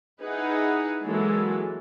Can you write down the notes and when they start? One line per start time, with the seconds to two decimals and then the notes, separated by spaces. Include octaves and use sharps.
0.21 D#4 E4 G#4 B4 F#5
1.04 E3 F#3 G#3 A#3 E4 A4